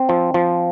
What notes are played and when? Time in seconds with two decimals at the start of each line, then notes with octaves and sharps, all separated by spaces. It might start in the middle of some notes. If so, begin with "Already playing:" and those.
Already playing: C4
0.09 F3
0.34 F3